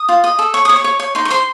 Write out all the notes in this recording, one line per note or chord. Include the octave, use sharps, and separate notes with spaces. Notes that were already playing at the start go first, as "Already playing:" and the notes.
Already playing: D#6
F4
D#5
A4
C#5 C#6
C#5 D#6
C#6
C#5
C#5
D#4 C6
C#6
C5 C6